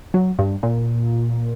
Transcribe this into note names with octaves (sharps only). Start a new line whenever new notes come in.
F#3
G2
A#2